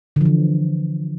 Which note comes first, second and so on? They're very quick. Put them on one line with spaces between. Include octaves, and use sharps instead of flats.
D3 F3 E3